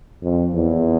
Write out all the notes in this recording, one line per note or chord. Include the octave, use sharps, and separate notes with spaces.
F2
E2